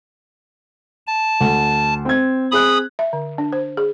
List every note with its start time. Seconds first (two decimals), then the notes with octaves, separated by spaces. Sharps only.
1.07 A5
1.41 D2
2.05 C4 G#6
2.51 C4 G#4 B5 D#6 F#6
2.99 E5
3.13 D3
3.38 D4
3.52 C5
3.77 G#4